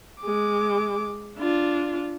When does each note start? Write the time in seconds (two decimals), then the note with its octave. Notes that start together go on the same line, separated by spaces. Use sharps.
0.22 G#3 D6
1.38 D4 F4